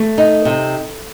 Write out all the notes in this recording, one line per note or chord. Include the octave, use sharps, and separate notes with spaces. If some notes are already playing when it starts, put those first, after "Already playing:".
Already playing: A3
D#4
C3